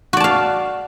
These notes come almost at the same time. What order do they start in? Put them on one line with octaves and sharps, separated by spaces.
F#4 D5 A5 F5